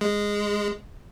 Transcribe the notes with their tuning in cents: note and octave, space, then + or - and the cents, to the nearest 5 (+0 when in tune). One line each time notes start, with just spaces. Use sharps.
G#3 -10